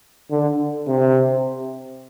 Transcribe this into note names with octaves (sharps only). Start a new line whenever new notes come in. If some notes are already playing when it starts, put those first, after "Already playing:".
D3
C3